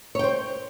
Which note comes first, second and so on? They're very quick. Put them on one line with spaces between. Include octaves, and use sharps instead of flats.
C#5 G5 C5